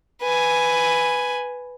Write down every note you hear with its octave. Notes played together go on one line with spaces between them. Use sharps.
B4 G#5